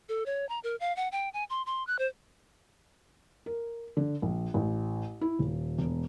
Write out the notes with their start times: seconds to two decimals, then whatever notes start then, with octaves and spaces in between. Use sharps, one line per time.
0.09 A4
0.26 C#5
0.49 A#5
0.64 A#4
0.80 F5
0.96 F#5
1.12 G5
1.34 G#5
1.50 C6
1.66 C6
1.87 F#6
1.99 C5
3.46 A#4
3.97 D3
4.22 A#1
4.54 A1
5.21 E4
5.39 D#1
5.78 E1